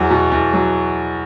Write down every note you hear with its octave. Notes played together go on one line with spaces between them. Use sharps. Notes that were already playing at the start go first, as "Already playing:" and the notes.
Already playing: E2 F#3
B2
E2
F#3